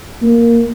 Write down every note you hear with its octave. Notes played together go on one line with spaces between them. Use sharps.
A#3